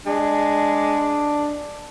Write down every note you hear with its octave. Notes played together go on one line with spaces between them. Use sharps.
G#3 D4